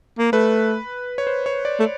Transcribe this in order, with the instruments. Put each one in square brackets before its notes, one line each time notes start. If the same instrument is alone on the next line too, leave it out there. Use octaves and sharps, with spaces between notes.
[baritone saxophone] A#3
[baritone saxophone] A3 [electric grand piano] B4
[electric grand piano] C#5
C5
C#5
D5
[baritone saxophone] A3